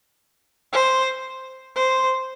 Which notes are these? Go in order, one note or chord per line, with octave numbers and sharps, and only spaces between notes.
C5
C5